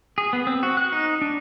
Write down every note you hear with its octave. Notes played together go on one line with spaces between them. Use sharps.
G#4
B3
C4
F#4
F#6
D#4
D4